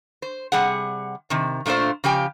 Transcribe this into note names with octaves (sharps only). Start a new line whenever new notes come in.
C5
C3 G3 G#4 F#5
C3 D#3
A#2 A3 D4 F4 C5
C#3 F3 G4 G5 G#5